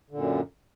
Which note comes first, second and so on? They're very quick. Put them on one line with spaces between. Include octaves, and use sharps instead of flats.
D3 A#2 F#2